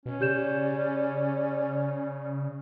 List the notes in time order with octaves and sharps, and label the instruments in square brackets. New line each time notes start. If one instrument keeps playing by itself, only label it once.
[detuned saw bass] B2 [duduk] C#4
[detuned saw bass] C#3 [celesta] G4 G6 E7 [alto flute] D5